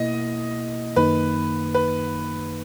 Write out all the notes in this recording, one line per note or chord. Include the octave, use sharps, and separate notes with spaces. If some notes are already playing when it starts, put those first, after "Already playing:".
Already playing: B2 A#3 E4 D#5
F#2 D#3 A#3 D#4 B4
B4